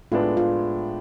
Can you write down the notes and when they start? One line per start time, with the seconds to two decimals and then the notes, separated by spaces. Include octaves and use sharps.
0.12 A2 G#3 B3 D4 F4
0.37 F4